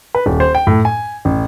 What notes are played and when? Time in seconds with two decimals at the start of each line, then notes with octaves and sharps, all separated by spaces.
0.15 B4
0.26 D#1
0.40 C5
0.55 G5
0.67 A2
0.85 G#5
1.25 A1